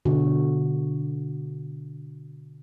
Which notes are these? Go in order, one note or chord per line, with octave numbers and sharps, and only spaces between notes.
B2 D3 F#4